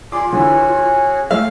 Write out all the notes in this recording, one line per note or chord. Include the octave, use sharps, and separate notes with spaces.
F4 G#4 D5 C6 D6
D3 E3 C#4 F#4 G#4
G#3 A3 F5 E6